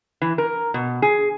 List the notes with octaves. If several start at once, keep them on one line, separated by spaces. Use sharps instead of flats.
E3
A#4
B2
G#4